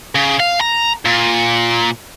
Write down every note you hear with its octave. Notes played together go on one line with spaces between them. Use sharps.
C#3
F5
A#5
A#2